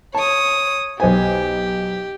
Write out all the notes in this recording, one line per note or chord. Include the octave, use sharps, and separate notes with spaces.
C#5 A5 D#6
B1 G4 C5 G#5